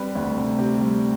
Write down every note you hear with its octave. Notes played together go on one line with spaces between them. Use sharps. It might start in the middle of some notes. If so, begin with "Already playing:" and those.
Already playing: G3 C4 B4
D2
C3
C4 G4
G3